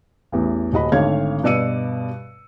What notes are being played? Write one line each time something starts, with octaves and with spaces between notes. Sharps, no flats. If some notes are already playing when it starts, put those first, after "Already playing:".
A1 E2 A2
D#1 F#4 D#5 B5
G#1 D3 A3 C#5 F5 G#6
G2 B2 D5 E6 C#7 D#7